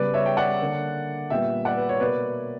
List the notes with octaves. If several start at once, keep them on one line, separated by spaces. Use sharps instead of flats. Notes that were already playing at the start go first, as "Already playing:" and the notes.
Already playing: C#3 G3 B3 B4 D5
C#5 E5
G5
D5 F#5
D3 A#3
A#2 G3 B3 E5 G5
D5 F#5
B4
C#5
B2 A#3 B4 D5